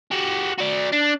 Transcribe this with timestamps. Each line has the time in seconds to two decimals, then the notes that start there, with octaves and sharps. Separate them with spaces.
0.11 F#4 G4
0.58 F#4 D5
0.92 D4